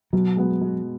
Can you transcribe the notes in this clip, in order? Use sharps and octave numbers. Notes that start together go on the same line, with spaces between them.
B2 F#3
G#3 B3 F#4
B2